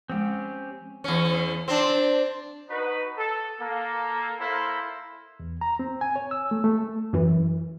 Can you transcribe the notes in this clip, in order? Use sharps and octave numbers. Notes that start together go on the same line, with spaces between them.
F3 G#3 C4 C#4 G4
E2 C#4
C4 D4
D#4 F#4 B4
A4
A#3 A4
A#3 E4 A4 C5
E2
A#5
C4
G#5
C#5
E6
A3
A3
F#2 E3